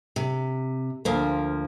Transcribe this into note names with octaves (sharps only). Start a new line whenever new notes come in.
C3
D2 F3 A#3